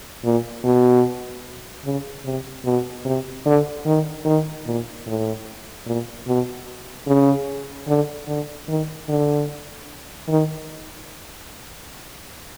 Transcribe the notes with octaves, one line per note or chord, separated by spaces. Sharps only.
A#2
B2
C#3
C3
B2
C3
D3
D#3
D#3
A#2
A2
A#2
B2
C#3
D3
D3
D#3
D3
D#3